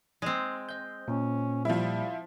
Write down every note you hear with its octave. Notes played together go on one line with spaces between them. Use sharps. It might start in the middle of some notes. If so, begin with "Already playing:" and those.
G#3 C4
D#5 G6
A#2 C#4
F3 G3 E4